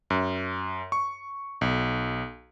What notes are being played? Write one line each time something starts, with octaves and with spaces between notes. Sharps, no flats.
F#2
C#6
B1